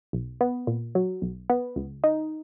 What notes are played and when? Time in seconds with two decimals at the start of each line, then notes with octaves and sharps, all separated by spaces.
0.13 B1
0.41 B3
0.67 A#2
0.95 F#3
1.22 B1
1.50 B3
1.76 C#2
2.04 D#4